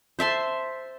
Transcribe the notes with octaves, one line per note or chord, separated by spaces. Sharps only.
C5 E5 A5 C6